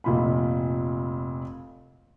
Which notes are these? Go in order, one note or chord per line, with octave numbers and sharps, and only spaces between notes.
F1 A#2 B5